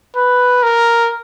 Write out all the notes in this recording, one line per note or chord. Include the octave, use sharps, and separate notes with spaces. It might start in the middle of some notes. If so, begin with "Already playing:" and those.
B4
A#4